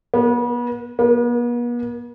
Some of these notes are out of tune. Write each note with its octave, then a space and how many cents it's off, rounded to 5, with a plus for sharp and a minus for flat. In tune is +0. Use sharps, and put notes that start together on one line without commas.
B3 -35
B3 -45